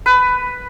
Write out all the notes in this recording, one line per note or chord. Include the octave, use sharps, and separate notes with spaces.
B4